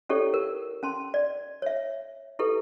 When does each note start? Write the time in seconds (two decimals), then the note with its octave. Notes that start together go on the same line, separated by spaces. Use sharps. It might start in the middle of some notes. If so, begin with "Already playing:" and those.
0.09 C#4 E4 G4 A4 C#5 D5
0.34 A#4
0.83 C#4 A5 C6
1.14 D5
1.62 C#5 E5
2.39 E4 G4 A4 B4